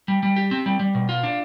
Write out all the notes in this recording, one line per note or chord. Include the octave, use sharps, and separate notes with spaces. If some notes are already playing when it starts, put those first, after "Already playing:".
G3
G3
G4
C4
G3
G3
B2
F4
D4